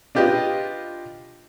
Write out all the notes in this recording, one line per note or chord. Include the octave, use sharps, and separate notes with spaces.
D4 F4 G4 B4 D#5